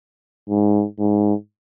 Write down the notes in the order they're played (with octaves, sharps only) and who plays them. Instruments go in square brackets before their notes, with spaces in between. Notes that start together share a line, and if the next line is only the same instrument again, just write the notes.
[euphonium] G#2
G#2